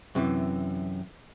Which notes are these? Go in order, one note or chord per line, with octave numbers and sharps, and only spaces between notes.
F#2 C3 E3